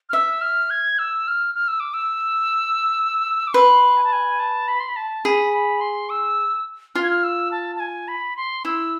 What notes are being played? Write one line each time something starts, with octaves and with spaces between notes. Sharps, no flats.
F6
E5 E6
F6
G#6
E6
F6
F6
E6
D6
E6
D6
B4 C6
G#5
A5
G#5
A5
B5
C6
B5
A5
G#4 B5
B5
C6
E6
F4 F6
G#6
F6
E6
A5
A5
G#5
B5
C6
E4 E6